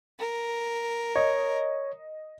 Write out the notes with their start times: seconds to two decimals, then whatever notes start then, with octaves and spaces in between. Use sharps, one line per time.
0.19 A#4
1.16 C#5 D#5